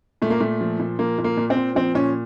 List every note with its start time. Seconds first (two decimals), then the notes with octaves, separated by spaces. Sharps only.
0.22 A#2 A3
0.30 A#3
0.40 A#2 A3
0.61 F3
0.80 A#2
0.99 F3 A#3
1.18 A#2
1.24 A#3
1.37 A#2
1.50 C4
1.57 A#2
1.75 F3 C4
1.95 A#2 C#4